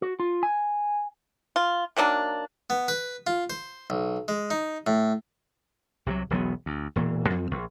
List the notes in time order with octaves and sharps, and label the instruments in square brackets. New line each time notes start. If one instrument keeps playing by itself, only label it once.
[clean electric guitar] F#4
F4
G#5
[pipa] F4
D#3 F#3 A#3 D4
[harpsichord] B3
B4
F4
C5
B1
G#3
D#4
A2
[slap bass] C2 C3 E3 F#3
E1 B1 F#3 B3
D2
E1 A#2 E3
F2 F3 C4
A#1